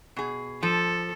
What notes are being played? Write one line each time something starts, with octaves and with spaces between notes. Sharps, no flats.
B2 G#4
F3 A4